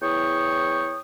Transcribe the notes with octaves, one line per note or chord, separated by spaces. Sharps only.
E2 E4 C#5 G5 C#6 D#6